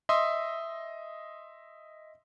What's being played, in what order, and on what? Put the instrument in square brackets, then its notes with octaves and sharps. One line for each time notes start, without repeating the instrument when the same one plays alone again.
[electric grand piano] D#5 E5 C6 D#6